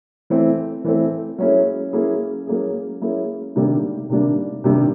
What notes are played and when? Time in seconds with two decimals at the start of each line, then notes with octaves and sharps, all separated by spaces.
0.30 E3 A3 C4
0.84 E3 A3 C4
1.38 F#3 A#3 C#4 E4 G#4
1.93 F#3 A#3 C#4 E4 G#4
2.47 F#3 A#3 C#4 E4 G#4
3.01 F#3 A#3 C#4 E4 G#4
3.56 C3 D#3 G3 A#3 D4
4.10 C3 D#3 G3 A#3 D4
4.64 C3 D#3 G3 A#3 D4